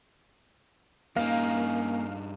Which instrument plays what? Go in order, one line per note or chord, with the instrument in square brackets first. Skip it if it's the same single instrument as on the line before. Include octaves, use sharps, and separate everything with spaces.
[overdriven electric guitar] G2 D#4 [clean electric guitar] A#3 [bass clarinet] C#4 [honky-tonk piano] F5